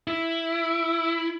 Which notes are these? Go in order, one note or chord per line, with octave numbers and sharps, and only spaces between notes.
E4